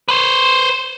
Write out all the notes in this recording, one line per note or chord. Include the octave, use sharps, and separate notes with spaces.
B4 C5